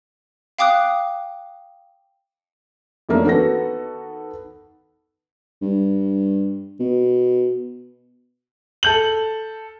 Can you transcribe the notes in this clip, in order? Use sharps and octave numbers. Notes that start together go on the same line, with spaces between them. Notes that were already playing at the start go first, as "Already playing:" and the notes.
F5 G5 D6 D#6 F#6
F2 E3 A3 A#3 C#4 D4
D#3 B3 F#4 A4 A#6
G2
B2
A4 G6 F#7